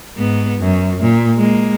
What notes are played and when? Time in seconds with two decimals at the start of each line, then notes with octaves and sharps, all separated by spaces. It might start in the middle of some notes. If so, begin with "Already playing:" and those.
0.17 G#2 B3
0.60 F#2
1.02 A#2
1.37 G#3 A#3